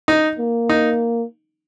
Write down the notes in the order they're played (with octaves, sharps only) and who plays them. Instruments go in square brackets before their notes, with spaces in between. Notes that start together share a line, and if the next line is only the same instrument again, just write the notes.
[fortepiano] D#4
[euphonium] A#3
[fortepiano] D#4